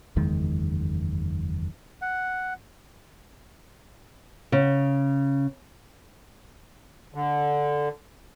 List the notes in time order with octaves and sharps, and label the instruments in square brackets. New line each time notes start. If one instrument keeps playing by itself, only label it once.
[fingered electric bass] F#1 E2 D#3 G#3
[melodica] F#5
[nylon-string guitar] C#3
[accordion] D3